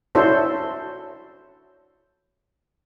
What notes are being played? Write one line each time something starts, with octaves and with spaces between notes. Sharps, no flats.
C#4 D4 E4 F#4 A4 C5